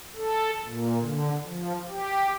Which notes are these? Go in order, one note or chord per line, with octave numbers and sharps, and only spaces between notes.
A4
A#2
D3
F3
G4